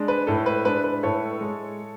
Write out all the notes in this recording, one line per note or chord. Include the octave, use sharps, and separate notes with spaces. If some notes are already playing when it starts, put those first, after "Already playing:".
Already playing: G#3 D4
B4
A2 A4
B4
G#3 D4 B4
B4
A2 A4 C#5
G#3